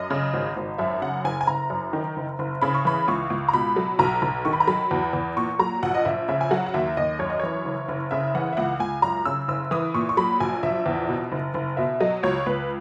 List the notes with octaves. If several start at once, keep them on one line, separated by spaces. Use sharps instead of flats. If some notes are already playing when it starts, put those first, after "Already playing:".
Already playing: F#2 D#5
C#3
G#1
G#1
F#2 E5
C#3 F#5
F#1 G#5
G#5
F#1 A#5
F#2
D#3
F#1
F#1
C#3 B5
C#6
E3 B5
C#2 C#6
C#2
A#5
B2 B5
F#3
B1 A#5
B1
D#3 C#6
B5
A#5
F#3 B5
E2
E2
A#2 C#6
F#3 A#5
A#1 F#5
D#5
A#1 E5
C#3 E5
G#5
F#3 F#5
F#5
D#2 E5
D#2 D#5
F#2 C#5
D#5
E3 C#5
F#1
F#1
C#3 E5
E3 F#5
E5
C#2 F#5
C#2 G#5
F#2 A#5
C#3 E6
F#1 E6
E3 D#6
A#2 C#6
C#6
F#3 B5
A#1 G#5
A#1 E5
E2
B2
F#1
F#1
B2 E5
F#3 D#5
C#2 C#5
C#2 B4